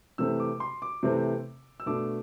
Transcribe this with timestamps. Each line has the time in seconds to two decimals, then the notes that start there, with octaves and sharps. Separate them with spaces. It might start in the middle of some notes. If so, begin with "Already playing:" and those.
0.18 C3 E3 A3 C4 E6
0.40 D6
0.60 C6
0.82 D6
1.03 C3 E3 A3 C4
1.80 E6
1.86 B2 A3 D4 D6